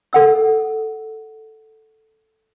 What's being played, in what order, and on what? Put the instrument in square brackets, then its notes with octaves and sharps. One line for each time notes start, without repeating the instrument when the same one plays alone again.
[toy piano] A4 F#5 E6